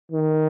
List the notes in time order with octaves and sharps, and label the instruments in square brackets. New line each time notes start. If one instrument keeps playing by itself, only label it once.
[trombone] D#3